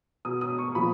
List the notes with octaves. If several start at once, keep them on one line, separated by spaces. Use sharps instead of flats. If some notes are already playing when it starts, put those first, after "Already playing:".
B2 D#6
D#6
C#6
A#2 F3 B5